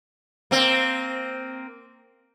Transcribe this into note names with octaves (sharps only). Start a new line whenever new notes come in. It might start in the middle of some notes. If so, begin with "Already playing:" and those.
A#3 C4